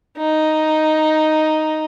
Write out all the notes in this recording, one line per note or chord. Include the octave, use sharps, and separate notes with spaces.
D#4